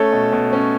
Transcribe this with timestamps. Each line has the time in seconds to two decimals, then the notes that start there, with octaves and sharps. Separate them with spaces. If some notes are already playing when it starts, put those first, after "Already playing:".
Already playing: A3 C#4 A4 C#5
0.13 B2
0.33 B2
0.53 C#4